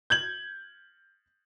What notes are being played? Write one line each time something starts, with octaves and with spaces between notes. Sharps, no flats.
G6 G#6 F#7